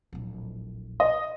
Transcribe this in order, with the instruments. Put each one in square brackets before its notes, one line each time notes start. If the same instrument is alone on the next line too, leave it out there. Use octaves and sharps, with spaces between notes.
[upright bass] D1 A#1
[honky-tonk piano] D#5